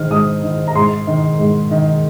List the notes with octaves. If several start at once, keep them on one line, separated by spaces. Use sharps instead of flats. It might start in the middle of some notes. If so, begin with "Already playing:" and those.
Already playing: G#2 D#3 C5 F6
G#2 D#6
D#3
A#5
G#2 C6
D#3
G#2
D#3